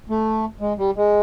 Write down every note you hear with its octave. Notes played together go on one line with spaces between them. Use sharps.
A3
G#3
G3
G#3